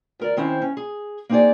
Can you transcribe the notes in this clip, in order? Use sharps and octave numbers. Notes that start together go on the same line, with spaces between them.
D2 A#4 D5
D#3 C4 C#4 E4 C5
C#4
G#4
A#3 C4 D#4 G4 G#4 D5